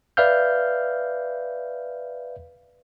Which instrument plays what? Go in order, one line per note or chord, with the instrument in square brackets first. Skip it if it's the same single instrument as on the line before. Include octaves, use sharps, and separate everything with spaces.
[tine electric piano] B4 D5 E5 F5 F6 G6